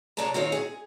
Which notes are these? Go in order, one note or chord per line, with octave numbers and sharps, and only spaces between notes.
E2 C3 D4 C#5 A5 A#5
D#3 C4 D#4 F4 C#5
G#4